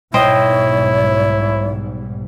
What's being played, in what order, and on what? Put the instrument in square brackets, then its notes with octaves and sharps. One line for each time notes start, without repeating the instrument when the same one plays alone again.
[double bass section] B1 G#2 G3 [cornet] E4 [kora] C5 D#5 G5 [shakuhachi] C#5